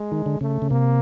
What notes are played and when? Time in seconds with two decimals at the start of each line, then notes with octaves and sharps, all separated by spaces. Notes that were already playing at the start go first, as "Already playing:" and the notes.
Already playing: G#3
0.12 D#3
0.26 D3
0.41 C#3 A3
0.62 C#3
0.71 C3 A#3